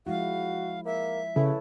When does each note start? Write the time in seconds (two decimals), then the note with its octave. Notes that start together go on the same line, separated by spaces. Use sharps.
0.07 F3 G#3 E4 F#4 F5
0.85 A#3 E5
1.36 C#3 E4 A4 B4 C#5